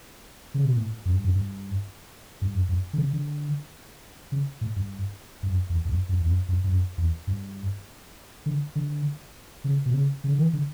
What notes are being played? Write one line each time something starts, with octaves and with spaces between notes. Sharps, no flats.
C#3
B2
A2
F#2
G2
F#2
G2
G2
F#2
F#2
D3
C#3
D3
C#3
A2
G2
G2
F#2
E2
E2
F#2
F#2
E2
F#2
F#2
G2
F#2
E2
G2
D3
D3
C#3
B2
C#3
C#3
D3
E3
D3